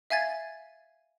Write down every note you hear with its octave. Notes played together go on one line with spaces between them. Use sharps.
E5 F5 G#5 G#6 A6